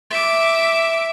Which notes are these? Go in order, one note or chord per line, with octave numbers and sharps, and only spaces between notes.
E5 D6